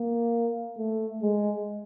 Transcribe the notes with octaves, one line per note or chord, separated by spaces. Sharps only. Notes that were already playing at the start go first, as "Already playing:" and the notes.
Already playing: A#3
A3
G#3